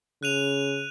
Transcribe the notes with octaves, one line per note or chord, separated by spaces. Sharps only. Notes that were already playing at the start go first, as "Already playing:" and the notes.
C#3 F#6 D#7 F7